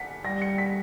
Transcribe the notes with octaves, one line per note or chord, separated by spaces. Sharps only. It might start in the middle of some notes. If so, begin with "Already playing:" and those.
Already playing: B6 C#7
G3 A#6
C#7
B6